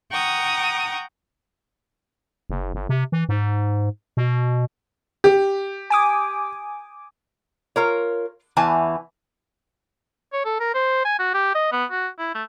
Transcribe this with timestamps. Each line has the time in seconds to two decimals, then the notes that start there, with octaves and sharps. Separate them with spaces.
0.11 F#5 G5 A#5 C#6 D#6
2.50 F#1
2.74 G1
2.89 C3
3.12 E3
3.29 G#2
4.17 B2
5.24 G4
5.90 G#5 D6 D#6
7.76 F4 A#4 C#5
8.57 E2 E3 G#5 A5
10.33 C#5
10.45 A4
10.60 A#4
10.74 C5
11.05 G#5
11.19 F#4
11.34 G4
11.55 D#5
11.72 B3
11.91 F#4
12.19 E4
12.35 A3